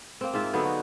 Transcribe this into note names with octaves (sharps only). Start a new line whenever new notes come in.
A#3 C4
G#2 F4 E5
D3 F#3 B3 D#4
F#4